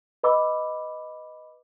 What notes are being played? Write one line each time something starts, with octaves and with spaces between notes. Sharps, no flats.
B4 D#5 B5 D6 E6